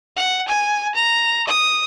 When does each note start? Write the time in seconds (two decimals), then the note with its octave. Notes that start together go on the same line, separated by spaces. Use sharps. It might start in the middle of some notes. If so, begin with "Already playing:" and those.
0.16 F#5
0.48 G#5
0.95 A#5
1.47 D#6